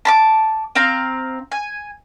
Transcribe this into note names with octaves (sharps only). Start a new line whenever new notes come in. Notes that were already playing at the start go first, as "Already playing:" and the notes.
A5 B5 D6
C4 F5 A#5
G#5